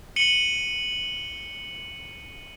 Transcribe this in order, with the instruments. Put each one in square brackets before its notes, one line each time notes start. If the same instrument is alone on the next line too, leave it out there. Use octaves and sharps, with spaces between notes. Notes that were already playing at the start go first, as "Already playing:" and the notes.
[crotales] C#7 D#7 F#7 G7